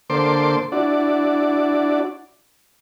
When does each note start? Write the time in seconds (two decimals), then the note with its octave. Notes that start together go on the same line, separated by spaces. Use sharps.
0.10 D3 A#3 A4 C5 C6 D6
0.72 D4 E4 F#4 D5